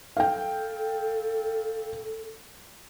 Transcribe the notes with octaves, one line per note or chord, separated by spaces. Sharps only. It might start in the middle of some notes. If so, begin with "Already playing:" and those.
A4 F5 G5